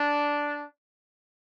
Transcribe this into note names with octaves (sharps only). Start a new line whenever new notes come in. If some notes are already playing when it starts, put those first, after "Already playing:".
Already playing: D4